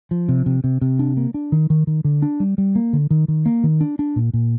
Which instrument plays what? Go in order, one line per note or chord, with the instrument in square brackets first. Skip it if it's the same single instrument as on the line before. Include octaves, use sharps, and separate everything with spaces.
[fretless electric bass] F3
C3
C3
C3
C3
D4
A#3
D4
D#3
D#3
D#3
D3
D4
G3
G3
A#3
D3
D#3
D#3
A#3
D#3
D4
D4
A#2
A#2